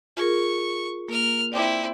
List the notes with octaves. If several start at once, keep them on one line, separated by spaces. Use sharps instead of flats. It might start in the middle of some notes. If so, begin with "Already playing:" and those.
F4 G#4 A#4 C#6
A#3 A#4 F6
C4 E4 D5 G5 D6